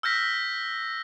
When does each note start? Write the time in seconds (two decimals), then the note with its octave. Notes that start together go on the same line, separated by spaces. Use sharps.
0.03 E6 F6 G6 A#6 B6